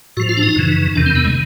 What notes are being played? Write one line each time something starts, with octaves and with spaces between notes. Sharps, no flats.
A2 F3 F#4
F4
D4
D#4
F#2 C#3 E3
E2 C3 D#3 D4
C4
B3
G#3